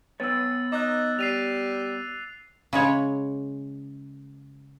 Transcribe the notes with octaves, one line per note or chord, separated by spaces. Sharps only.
B3 B4 C#5 E6 A6
D#4 D6 F#6
G3 C7 D#7 F7
C#3 G#3 C#5